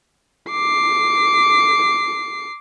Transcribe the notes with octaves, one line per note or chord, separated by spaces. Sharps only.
D6 C7